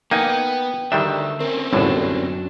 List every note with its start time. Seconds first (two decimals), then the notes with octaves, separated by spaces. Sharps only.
0.11 A#3 B3 D#4 G5 G#5
0.92 D2 D#3 G3 D4 E5
1.40 C4 C#4 A#4
1.73 G1 C2 F#2 A2 F#3 D4